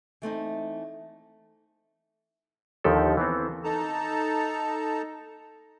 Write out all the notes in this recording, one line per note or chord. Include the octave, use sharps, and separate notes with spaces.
E3 A3 C4 D#4
D#2 D3 D#3 F3 G4 A4
E3 B3 C4
D#4 A4 A5 A#5